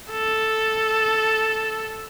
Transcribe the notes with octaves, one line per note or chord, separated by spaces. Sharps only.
A4